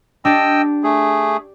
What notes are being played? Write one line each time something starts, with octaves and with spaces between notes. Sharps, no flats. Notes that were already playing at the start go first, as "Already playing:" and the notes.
D4 G4 D#5 G5 E6
A3 G#4